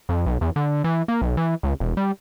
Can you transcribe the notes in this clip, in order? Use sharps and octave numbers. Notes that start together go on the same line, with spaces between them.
F2
B1
E2
D3
E3
A#3
B1
E3
C#2
E1
G3